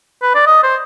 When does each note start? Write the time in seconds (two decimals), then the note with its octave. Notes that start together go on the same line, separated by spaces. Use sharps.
0.22 B4
0.35 D5
0.47 D#5
0.63 C5